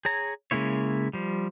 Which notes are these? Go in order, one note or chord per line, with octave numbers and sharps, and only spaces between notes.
G#4 C#5 A#5
C#3 G#3 A#3 E4 C#5
F3 G3